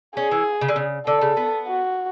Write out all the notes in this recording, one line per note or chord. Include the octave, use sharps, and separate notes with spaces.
C#4 G#4
E3
C#3
D3
C#3
D3 A4
C#3
B3
F#4